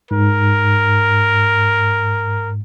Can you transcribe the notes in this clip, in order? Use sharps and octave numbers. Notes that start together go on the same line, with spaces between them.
G#2 A#4